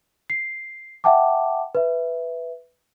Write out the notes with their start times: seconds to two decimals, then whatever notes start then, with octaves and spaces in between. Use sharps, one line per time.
0.30 C7
1.04 E5 F#5 G5 A5 D6
1.75 B4 E5